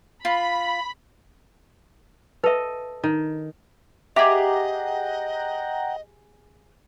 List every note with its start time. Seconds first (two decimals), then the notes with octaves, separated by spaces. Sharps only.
0.25 F4 B5
2.44 A4 B4 D#5 E5
3.04 D#3
4.16 G4 G#4 D#5 E5 F#5 G5 A#5 D6